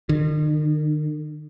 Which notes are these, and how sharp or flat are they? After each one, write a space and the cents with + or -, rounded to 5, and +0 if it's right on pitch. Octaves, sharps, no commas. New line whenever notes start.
D#3 -45